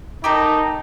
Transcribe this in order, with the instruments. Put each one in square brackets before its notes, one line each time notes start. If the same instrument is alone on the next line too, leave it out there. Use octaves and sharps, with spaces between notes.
[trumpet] D#4 [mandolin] G4 A4 A#4